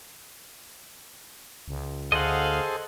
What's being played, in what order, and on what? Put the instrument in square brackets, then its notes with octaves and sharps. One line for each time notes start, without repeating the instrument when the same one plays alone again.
[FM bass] C#2
[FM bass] D2 [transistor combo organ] G#4 A4 C5 [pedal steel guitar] D#5 F#5 [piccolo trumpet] F5